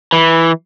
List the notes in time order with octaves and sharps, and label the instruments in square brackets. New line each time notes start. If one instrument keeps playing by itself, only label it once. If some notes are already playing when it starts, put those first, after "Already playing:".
[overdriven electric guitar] E3